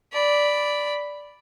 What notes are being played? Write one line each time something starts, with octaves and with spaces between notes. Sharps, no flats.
D5 B5